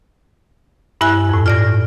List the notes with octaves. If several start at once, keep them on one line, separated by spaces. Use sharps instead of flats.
G2 E4 E5 G#5 F#6
F2 A2
F4 D5 A#6